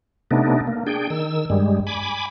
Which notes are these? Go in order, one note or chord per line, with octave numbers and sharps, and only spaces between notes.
C3 A3 B3 D4 D#4
A#3
D4 G#4 G5
D#3 E6
G2 G3 G#3
G#5 B5 D6